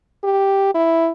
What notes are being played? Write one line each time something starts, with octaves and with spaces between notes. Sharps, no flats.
G4
E4